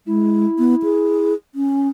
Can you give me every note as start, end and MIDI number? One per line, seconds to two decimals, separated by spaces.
0.07 0.45 56
0.07 1.33 64
0.58 0.75 59
0.84 1.34 68
1.55 1.88 61